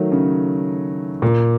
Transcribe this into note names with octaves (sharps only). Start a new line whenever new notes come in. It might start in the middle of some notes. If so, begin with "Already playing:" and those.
Already playing: D#3 F#3 A3
C#3
A#2